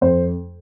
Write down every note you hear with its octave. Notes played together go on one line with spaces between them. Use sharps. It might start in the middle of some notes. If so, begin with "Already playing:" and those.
F2 C5